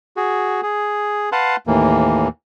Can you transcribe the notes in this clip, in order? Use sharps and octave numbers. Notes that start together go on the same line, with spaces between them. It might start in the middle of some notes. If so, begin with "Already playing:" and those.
F#4 G#4
G#4
B4 F5 F#5 A5 C6
D#2 A2 E3 A#3